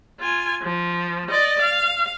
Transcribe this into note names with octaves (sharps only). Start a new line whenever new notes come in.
F4 G#5
F3
D5 D#5
F5